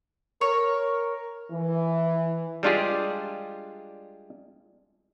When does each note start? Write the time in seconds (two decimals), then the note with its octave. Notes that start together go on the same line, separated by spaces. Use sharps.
0.41 A#4 C#5
1.51 E3
2.63 G3 G#3 D4 F4 G4 G#4